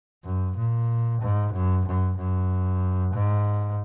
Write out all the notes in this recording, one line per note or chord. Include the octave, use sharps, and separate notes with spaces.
F#2
A#2
G#2
F#2
F#2
F#2
G#2